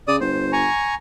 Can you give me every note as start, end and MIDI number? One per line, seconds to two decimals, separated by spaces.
0.08 0.18 49
0.08 0.16 74
0.08 0.16 87
0.21 0.68 31
0.21 0.52 72
0.52 0.95 80
0.52 0.95 82
0.52 0.95 85